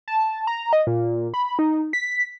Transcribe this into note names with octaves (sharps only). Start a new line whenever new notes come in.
A5
A#5
D#5
A#2
B5
D#4
B6